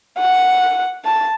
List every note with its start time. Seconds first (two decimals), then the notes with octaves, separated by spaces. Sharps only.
0.18 F#5
1.05 A5